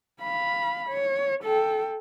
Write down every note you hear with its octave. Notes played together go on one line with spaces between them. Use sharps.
F5 B5
C#5
A4 G5